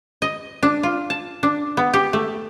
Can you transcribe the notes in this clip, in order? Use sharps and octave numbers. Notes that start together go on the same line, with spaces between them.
D#5
D4
F4
A5
D4
B3
G4
A3